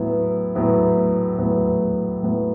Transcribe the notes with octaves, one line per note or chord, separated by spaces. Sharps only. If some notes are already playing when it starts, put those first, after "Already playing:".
Already playing: A2 F#3 B3 E4
A2 F#3 B3 E4
A2 F#3 B3 E4
A2 F#3 B3 E4